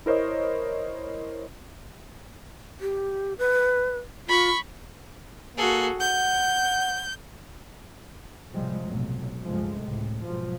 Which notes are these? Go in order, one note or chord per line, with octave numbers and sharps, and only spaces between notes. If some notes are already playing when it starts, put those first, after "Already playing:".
E4 A#4 C5 C#5 D#5
G4
B4
F4 B5 C#6
A#3 F#4 G#4 A4
F#5 G6
A2 C3 F3 G3 G#3
F1 B1 A2 F#3
C#2 G2 F3 G#3 A3
C#2 A2 C3
G#2 B2 F3 F#3